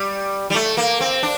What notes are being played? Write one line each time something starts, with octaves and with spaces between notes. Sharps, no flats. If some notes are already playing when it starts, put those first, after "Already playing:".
Already playing: G3
G3
A3
A#3
C4
D4